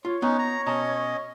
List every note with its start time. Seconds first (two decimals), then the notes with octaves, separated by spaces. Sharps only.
0.05 F4 C#5
0.22 B3 C#4 D#4
0.39 A#5
0.67 B2 C#4 D#5 A5 A#5